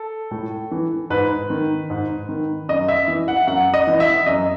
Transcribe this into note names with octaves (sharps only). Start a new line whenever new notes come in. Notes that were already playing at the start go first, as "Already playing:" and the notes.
Already playing: A4
A2
E3
G#2 B4
D#3
G#2
D#3
F#2 D#5
E5
E3
F#5
F#2 F#5
D#5
E3
E5
F#2 D#5